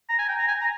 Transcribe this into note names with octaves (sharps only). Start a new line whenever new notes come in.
A#5
G#5
G5
A#5
G#5
A#5